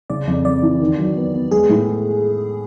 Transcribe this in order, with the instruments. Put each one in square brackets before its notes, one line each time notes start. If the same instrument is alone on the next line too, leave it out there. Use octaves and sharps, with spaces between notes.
[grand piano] C#3 [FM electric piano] D5
[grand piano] F2
[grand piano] F2 [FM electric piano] D5
[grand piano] E3
D#3
F#3
B3
B3
[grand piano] G#3 [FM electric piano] G#4
[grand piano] A2